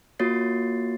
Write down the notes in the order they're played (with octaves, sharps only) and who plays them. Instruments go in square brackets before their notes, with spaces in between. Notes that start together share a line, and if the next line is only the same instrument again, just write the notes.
[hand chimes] A#3 F4 F#4 C#5 A6 C7